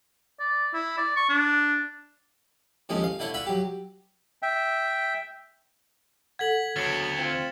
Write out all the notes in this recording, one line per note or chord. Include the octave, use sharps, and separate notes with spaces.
D5
E4
D5
C#6
D4
D#2 A2 F3 G#3 C#4
F5
D3 A3 E4 C#5
F4 F#4 E5 B5
F#3 G4
E5 G5
A4 F#5 G#6 B6 F#7
D2 C#3 F#3 B3 A6 C#7 E7
C4 F4